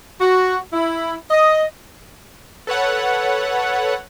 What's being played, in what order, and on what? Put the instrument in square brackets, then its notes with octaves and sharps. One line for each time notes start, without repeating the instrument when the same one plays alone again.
[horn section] F#4
E4
D#5
[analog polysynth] A4 B4 C#5 F#5